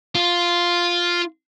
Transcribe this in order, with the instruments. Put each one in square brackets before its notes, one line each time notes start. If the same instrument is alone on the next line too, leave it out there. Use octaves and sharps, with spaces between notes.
[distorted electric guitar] F4